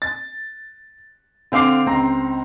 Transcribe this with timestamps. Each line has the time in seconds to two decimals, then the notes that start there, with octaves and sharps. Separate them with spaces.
0.02 A6
1.52 D3 C4 F5 D6 C7
1.86 C#2 C4 A#5